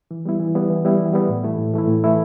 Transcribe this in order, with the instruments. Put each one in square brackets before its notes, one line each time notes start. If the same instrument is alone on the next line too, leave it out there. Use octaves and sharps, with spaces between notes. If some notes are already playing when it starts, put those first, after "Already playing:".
[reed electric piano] E3
G3 B3 E4
E3
G3 B3 E4
E3
G3 B3 E4
E3
G3 B3 E4
A2
E3 A3 E4
A2
E3 A3 E4
A2
E3 A3 E4